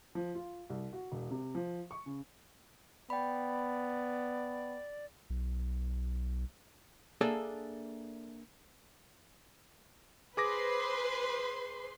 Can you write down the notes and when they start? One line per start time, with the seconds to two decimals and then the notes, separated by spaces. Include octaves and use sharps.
0.15 F3
0.35 F4
0.70 C2
0.93 F#4
1.12 E1
1.31 C3
1.55 F3
1.91 C#6
2.06 C#3
3.10 B3 D5 G5 B5
5.30 B1
7.21 A#3 D4 G#4 A4 D5 E5
10.37 G#4 B4 C5 C6 D6 A#6